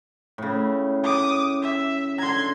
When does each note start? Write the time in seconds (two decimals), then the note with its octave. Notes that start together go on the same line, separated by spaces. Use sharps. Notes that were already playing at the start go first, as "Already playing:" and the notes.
0.38 A2 C#3
1.03 D6 D#6
1.62 E5
2.18 D3 A#5 C6 G#6